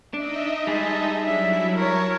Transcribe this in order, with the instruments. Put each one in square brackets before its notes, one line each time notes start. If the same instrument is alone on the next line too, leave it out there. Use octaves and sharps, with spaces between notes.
[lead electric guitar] D4 [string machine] D#4 D#5 E5
[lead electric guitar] G3 G#4 [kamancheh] G#3 A5
[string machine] F#3 E4 [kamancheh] D4 E5
[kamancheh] A#4 C#5 [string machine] A5 C#6